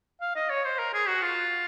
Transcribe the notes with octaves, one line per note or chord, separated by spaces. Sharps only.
F5
D#5
C#5
C5
A#4
G#4
F#4
F4